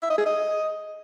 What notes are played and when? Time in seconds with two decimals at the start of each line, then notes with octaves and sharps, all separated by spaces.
0.02 E5
0.10 D#5
0.18 G#4
0.25 D#5